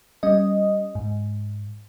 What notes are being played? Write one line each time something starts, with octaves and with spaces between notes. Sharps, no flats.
G3 C#4 D#5
G#2